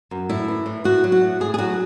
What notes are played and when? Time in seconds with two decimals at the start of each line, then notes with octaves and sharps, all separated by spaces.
0.11 F#2
0.29 A2 E4
0.48 E3
0.66 A2
0.84 A2 F#4
1.04 F#3
1.12 F#4
1.21 A2
1.40 A2 G#4
1.54 G#4
1.58 F#3 F#4